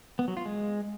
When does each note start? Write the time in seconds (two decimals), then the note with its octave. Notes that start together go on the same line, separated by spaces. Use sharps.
0.19 B3
0.28 F#3
0.37 F4
0.46 G#3